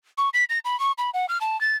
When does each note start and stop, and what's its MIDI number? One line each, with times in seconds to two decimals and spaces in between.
0.18 0.29 85
0.34 0.44 95
0.49 0.59 94
0.65 0.79 83
0.80 0.92 85
0.98 1.10 83
1.14 1.26 78
1.29 1.38 89
1.41 1.59 81
1.61 1.77 93